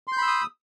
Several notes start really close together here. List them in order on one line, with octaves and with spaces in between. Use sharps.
C6 G6 B5 E6 D#6